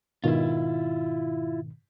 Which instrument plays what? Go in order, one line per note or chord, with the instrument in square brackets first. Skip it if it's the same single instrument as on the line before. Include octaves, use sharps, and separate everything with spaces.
[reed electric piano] G#2 B2 D#3 [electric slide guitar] E4 F4